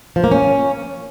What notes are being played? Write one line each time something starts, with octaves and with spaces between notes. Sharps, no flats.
F3
A#3
C#4